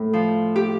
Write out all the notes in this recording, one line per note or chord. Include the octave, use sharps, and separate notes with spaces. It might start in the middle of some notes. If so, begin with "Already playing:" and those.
Already playing: A2
F3
G4